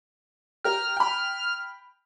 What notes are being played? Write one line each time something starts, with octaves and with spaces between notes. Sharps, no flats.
G4 A#4 F6
G5 B5